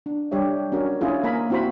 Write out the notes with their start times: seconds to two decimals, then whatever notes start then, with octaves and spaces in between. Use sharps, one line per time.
0.06 D4
0.31 G3 D4 G4 C#5 E5
0.72 C#4 D4 F#4 A#4
1.01 C#4 D4 E4 F4 G#4
1.24 A#3 A#4 E5 G#5 A#5 B5
1.50 C4 E4 F#4 C5 B5